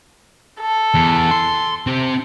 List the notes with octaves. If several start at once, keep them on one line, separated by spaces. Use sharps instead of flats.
A4
E2
C6
C4 G4